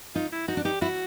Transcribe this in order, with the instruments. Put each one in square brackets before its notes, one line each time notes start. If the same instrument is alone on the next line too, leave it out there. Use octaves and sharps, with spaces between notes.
[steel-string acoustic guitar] D#4 [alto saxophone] F4
[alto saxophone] E4
[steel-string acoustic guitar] D#4 [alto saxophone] F#4
[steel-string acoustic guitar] D4
[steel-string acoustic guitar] D#4 [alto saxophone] G4
[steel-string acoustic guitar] E4 [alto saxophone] F#4